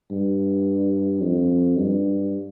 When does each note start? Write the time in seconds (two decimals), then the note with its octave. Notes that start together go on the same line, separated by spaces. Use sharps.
0.11 G2
1.22 F2
1.78 G2